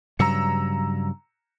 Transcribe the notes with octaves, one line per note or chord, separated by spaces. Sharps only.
G2 C#3 F#3 A#5 E6 C#7